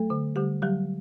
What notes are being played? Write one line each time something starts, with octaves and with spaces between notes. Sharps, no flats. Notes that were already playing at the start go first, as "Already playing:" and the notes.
Already playing: F#3 A3 A4
D3
D3 G3 G4
F#3 G3 G4